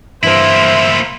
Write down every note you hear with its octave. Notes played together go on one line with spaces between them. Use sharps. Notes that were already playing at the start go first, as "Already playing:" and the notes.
G2 E3 A#3 E4 C5 E5